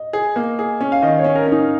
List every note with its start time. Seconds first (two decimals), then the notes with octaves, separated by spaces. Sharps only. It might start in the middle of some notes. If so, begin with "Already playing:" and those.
Already playing: D#5
0.13 G#4
0.36 A#3
0.59 G#4
0.81 C#4
0.92 F5
1.02 D#3 D#5
1.19 C#5
1.24 C#4
1.35 A#4
1.46 C#4
1.52 D#4